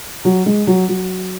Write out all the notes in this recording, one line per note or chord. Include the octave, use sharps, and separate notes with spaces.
F#3
G#3
F#3
F#3